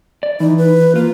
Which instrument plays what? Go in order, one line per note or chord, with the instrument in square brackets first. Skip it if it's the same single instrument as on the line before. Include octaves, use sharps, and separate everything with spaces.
[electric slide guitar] D5
[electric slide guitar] E3 [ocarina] D#4
[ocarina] B4
[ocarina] A#3 [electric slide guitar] F4